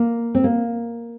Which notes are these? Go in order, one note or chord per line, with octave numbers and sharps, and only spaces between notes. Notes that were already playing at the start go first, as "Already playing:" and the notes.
Already playing: A#3
C4
A#3